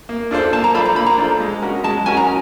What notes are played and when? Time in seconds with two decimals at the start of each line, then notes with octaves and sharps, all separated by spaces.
0.09 A#3
0.31 D4 F4 A4 C5
0.53 A#3 A5
0.64 A#5
0.74 D4 F4 A4 C5 B5
0.85 A#5
0.96 A#3 B5
1.06 A#5
1.18 D4 F4 A4 C5
1.40 G#3
1.62 C#4 F#4 A#4
1.84 G#3 A5
2.06 C#4 F#4 A#4 G#5
2.17 A#5